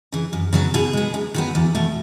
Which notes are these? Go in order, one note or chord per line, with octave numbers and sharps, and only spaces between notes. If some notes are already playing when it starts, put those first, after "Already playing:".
C#3 E3
F#2
C#3 F#3 B3
B2 G#4
G#3 B3
F#2
D#3 F#3 B3
E2
B2 A3